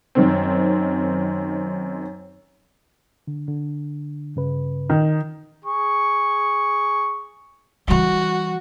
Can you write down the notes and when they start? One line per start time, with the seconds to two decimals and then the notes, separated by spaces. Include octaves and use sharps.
0.15 F#2 D#3 C4
3.27 D3
3.48 D3
4.36 G2 C#3 B4
4.90 D#3
5.64 G#4 C#6
7.88 E3 G3 F#4